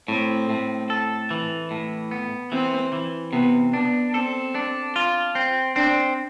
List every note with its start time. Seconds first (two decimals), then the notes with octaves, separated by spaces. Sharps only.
0.08 A2 C4
0.50 A2
0.90 A4
1.31 E3
1.71 A2
2.11 B3
2.52 E3 C4
2.93 E3
3.33 C3 B3
3.73 B3 D4
4.14 C4 A4
4.55 D4
4.96 F4
5.35 C4
5.76 C4 D4